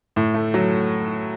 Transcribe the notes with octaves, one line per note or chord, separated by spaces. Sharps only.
A2
A3
F#3